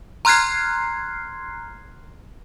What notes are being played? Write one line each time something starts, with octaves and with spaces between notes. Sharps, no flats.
A#5 C6 F6 F#6 G#6 C7